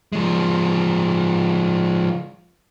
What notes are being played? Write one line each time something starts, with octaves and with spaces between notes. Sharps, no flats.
F3 G#3